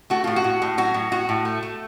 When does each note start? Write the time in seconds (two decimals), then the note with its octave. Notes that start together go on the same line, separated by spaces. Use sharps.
0.10 A3 F#4
0.24 A2 F4
0.36 F#4
0.44 A2
0.62 A2
0.78 F#3 F#4
0.94 A2
1.12 A2 F#4
1.29 A2
1.45 A3
1.63 A3